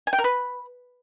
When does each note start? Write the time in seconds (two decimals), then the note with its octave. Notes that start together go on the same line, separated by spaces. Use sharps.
0.07 G#5
0.13 G5
0.18 A#4
0.24 B4